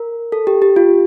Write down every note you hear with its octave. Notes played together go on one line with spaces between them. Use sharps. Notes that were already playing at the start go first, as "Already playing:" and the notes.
Already playing: A#4
A4
G4
G4
F4